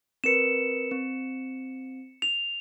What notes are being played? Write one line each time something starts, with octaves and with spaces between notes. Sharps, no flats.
C4 A#4 B4 C#7 E7
C4
F7